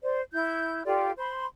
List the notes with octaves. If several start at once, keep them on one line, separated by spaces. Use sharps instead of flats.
C5 D5
E4 G6
F4 G4 A4 D5
C5 B5 C6